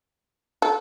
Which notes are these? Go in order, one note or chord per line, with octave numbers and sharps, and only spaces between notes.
A4